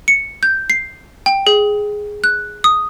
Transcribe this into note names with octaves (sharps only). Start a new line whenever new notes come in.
C#7
G6
C7
G5
G#4
F#6
D#6